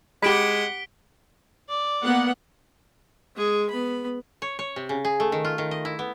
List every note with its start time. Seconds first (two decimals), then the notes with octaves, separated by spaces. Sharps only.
0.23 G#3 G4 F#5 B5 B6 D7 G7
1.69 D5
2.03 A#3 B3 F#5
3.36 G#3 G#4
3.70 B3 B5
4.42 C#5
4.59 C#5
4.76 C3
4.89 C#3
5.05 G#4
5.20 A3
5.32 D#3
5.45 F4
5.58 D#3
5.71 D#5
5.85 E4
5.99 B3